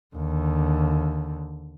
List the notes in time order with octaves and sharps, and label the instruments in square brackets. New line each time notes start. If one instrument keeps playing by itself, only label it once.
[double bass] D#2 D3